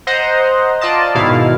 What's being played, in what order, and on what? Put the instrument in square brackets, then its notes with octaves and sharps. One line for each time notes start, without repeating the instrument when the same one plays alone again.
[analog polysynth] C5 D#5 F#5 A#5 C6
F4 D5 D#5 A5
G#2 B2 D#3 E4 F5